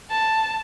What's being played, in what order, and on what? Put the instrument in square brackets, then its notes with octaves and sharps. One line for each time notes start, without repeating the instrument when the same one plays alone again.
[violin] A5